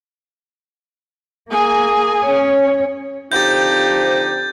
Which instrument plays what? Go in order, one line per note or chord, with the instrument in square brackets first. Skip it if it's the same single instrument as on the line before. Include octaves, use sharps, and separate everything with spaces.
[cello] A#3 [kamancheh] G#4 G#5
[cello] C#4 C#5
[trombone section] D3 F3 C4 [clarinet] D#4 [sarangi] G4 [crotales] G6 A6